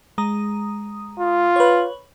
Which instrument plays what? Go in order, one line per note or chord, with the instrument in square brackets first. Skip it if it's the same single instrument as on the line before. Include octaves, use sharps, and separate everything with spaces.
[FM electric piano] G#3 A#5 D#6
[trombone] F4
[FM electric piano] B4 C#5